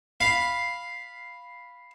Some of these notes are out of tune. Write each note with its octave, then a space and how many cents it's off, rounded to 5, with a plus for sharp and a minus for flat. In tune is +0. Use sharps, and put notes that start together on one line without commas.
F5 +0 B5 +0